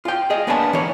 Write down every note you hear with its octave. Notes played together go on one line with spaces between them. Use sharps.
F4 G5
G#4 D#5 F5
A#3 B3 D4 C#5 G#5 A5
E3 A#3 C#5